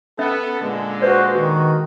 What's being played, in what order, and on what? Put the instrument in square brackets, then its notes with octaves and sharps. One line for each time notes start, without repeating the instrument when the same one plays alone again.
[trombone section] B3 A4 [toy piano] C#4 E5
[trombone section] A#2 D3 G#3
[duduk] F#4 [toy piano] B4 D5 [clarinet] C5
[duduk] D#3 [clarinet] F#4